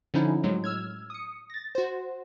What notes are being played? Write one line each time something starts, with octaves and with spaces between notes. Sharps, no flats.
D3 F3 C#4 D#4 E4
A2 F#3 G#3
E6 F6 G#6
D#6 C#7
A6 A#6
F#4 C5